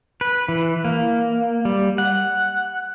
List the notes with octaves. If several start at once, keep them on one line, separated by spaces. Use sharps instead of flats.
B4
E3
A#3
G3
F#5